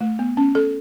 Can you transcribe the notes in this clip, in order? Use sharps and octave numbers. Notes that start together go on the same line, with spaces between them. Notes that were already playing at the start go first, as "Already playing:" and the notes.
A3
B3
C#4
A4